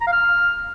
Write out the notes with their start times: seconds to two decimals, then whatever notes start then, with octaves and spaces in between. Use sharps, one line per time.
0.01 A#5
0.07 F5
0.12 F6